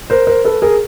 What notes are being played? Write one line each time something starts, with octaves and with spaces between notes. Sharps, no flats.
A#4 C5
A#4 C5
A4 B4
G#4 A#4